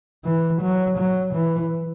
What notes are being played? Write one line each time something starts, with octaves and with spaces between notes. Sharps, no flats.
E3
F#3
F#3
E3